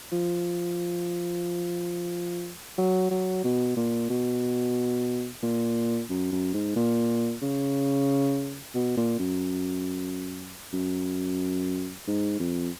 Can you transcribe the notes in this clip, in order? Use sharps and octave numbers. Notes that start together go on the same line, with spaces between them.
F3
F#3
F#3
B2
A#2
B2
A#2
F#2
F#2
G#2
A#2
C#3
B2
A#2
F#2
F#2
G#2
F2